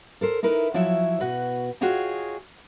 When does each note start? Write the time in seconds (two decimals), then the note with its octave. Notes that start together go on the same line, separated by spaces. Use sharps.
0.21 A4 A#4 C5
0.43 D#4 E4 A#4 B4
0.74 F3 F#3 E4 C#5 E5
1.21 B2 F#4 B4
1.81 F4 F#4 G#4 C#5 D#5 G5